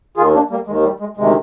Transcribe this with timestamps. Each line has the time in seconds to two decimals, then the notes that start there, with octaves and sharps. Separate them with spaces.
0.17 D#2 D#3 F4 G#4
0.34 A#3 D4
0.50 G3 A#3
0.67 D#2 D#3 G#3
0.84 G3
1.00 G#3
1.17 D2 C3 D#3 G#3